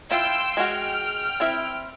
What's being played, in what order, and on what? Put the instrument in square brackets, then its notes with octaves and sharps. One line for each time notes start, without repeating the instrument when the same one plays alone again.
[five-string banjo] E4 F4 [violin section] G5 C6 E6
[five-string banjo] G#3 F#4 [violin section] G5 F6
[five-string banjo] C4 E4 E5